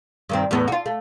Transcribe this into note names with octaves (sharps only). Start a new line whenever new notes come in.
G2 D#3 C4
E2 A2 B3
F4 F#4
A3